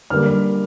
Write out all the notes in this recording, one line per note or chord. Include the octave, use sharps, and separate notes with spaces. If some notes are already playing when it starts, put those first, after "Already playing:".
D3 G3 A#3 F6